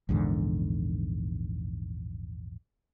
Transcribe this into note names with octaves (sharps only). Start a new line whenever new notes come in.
A#1 E2 G#2 D3